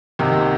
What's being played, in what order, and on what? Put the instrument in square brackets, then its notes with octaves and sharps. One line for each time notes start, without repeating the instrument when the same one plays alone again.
[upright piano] C2 C3 D#3 A#3 D#4